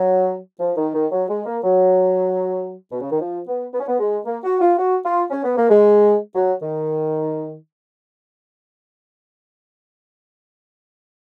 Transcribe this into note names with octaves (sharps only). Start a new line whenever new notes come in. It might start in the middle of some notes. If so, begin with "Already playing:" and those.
Already playing: F#3
F3
D#3
D#3
F#3
G#3
A#3
F#3
B2
C#3
D#3
F3
B3
B3
C#4
B3
G#3
A#3
F#4
F4
F#4
F4
C#4
B3
A#3
G#3
F#3
D#3